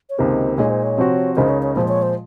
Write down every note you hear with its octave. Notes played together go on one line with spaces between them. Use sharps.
C#5
C#2 C3 D#3 A#3 C5
A#2 G#3 D#4 G#4 C#5
C5
C#5
C3 F3 C4 F#4
C#2 C#3 G#3 D#4 A#4 C5
C#5
C#5
A#2 F3 G#3 C5
C#5
C5